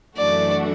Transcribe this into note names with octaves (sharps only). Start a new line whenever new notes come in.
F#2 E3 A3 D4 F#4 D5